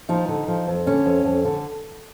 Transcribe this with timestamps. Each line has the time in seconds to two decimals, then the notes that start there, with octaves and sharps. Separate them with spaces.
0.09 F3 D#4
0.28 D3
0.48 F3
0.67 F2
0.86 D3 C#4
1.06 F2
1.25 F2
1.45 D3